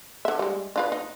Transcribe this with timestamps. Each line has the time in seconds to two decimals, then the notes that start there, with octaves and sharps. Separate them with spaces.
0.25 D3 E5
0.39 G3 G#3
0.76 D4 F4 B4
0.92 D#4